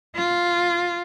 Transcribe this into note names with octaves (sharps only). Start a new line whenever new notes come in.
F4